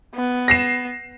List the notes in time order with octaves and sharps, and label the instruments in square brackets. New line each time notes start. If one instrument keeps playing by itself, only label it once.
[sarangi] B3
[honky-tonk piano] A#6 C7 E7